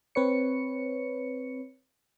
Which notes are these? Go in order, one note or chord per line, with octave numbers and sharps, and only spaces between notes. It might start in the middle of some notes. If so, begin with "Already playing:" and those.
C4 B4 C#5 C#7